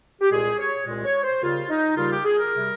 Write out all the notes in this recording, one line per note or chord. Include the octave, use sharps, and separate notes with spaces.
G4
C2 A#2 G#3 G#4
C#5
C2 A#2 G#3
C#5
C5
D#2 C#3 G3 F4
D#4
D#2 C#3 G3 F4
G4
G#4
A#4
C3 G3